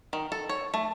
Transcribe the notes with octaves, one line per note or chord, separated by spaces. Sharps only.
D#3
A4
C#5
A3